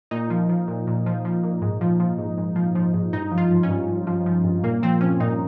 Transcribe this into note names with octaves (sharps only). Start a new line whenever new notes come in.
A#2 D#4
F3
F3
A#2
A#2
F3
F3
A#2
G#2
F3
F3
G#2
G#2
F3
F3
G#2
G2 D#4
F3
F4
F3
C#4
G2
G2
F3
F3
G2
A#2 A#3
F3 C4
F3 C#4
A#2 D#4